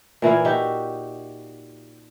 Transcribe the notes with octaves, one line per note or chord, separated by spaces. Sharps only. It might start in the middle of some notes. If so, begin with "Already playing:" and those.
A#2 E3 E4 F5
D#4 F#4 G4 E5